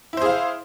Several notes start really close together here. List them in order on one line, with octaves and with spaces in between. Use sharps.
E4 C5 G#4 F5